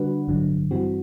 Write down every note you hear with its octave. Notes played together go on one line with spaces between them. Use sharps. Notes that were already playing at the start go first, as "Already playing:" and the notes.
Already playing: D3 G3 D4 F#4 B4
A1 G2 D3 F#3
G2 E3 G3 C4 F#4